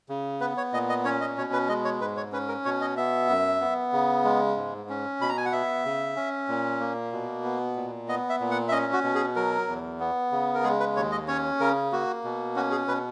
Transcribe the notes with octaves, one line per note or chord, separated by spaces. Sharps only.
C#3
B3 B4
C#5
A#2 D#5
D#5
C#4 C#5
D#5
B2 C#5
B4
G#3 D#5
C#5
G#2 B4
C#5
C#4 B4
A#4
B2 C#5
D#5
B3 E5
F#2
B3
C#3
G#3
G#2
C#4
B2 B5
A#5
G#5
F#5
B3 E5
C#3
C#4
A#2
A#3
B2
B3
A#2
B3 D#5
E5
A#2
F#5
E5
C#4 D#5
F#4
B2
G#4
F#3 A#4
E2
B3
C#3
A#4
G#3 G#4
B4
D#2 C#5
D#5
C#4 C#5
C#3 A#4
A#3 F#4
B2
C#4 F#4
G#4
B2 B4